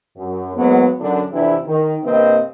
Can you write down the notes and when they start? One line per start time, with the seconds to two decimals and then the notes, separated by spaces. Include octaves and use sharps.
0.17 F#2
0.56 G#2 F#3 A#3 B3
0.99 F#2 D3 D4
1.32 F2 C3 E3 D4 E4
1.66 D#3
2.03 G2 C3 A#3 C4 B4 D#5